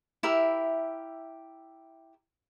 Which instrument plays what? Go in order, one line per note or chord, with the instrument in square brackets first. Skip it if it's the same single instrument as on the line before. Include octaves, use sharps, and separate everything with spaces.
[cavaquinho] E4 G4 A#4 E5